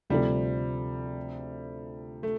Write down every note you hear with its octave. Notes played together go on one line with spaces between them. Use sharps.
D2 C3 F3 G3 C4 A4
A3